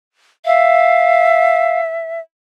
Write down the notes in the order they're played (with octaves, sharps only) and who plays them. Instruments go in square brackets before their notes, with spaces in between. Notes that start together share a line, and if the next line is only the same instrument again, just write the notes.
[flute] E5 [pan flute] F5